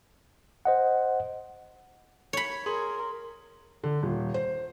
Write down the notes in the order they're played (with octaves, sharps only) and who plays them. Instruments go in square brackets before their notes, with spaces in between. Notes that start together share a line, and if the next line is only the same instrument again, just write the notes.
[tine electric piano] C5 D#5 F#5
[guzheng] C#5 B5
[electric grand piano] G#4 [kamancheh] A#4 [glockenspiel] C6
[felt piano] D3
D#1
C5